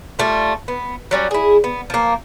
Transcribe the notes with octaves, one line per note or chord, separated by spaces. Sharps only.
G3 A3 F4
B3
F#3 G3 C#4
E4 G#4
B3
F3 A#3